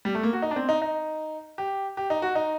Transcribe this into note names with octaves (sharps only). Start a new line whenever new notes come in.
G3
A3
A#3
F#4
D#4
D4
C4
D#4
D#4
G4
G4
D#4
F#4
D#4